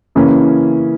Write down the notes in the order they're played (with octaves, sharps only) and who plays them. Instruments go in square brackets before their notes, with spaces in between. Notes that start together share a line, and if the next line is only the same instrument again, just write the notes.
[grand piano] C#3 E3 A#3 C#4